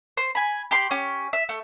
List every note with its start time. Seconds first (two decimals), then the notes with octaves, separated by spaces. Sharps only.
0.17 C5
0.35 G#5 B5
0.71 G4 G5 B5 C6
0.91 C#4 G4
1.33 E5
1.49 A3